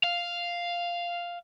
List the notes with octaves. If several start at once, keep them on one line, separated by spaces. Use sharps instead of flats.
F5